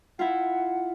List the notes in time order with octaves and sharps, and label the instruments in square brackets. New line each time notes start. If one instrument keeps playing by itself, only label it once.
[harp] E4 F4 [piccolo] F#5